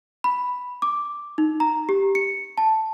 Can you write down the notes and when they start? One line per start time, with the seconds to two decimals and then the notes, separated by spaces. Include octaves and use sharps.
0.24 B5
0.82 D6
1.38 D#4
1.60 A#5
1.89 G4
2.15 C#7
2.58 A5